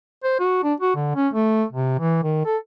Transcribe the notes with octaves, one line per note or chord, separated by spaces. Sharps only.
C5
F#4
D4
F#4
D3
C#4
A3
C3
E3
D#3
A4